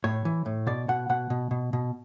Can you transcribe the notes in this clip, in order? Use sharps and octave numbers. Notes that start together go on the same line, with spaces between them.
A2 C#5
E3
A2
B2 D5
B2 F#5
B2 F#5
B2
B2
B2